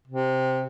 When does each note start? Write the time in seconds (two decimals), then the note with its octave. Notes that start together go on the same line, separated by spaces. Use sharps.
0.07 C3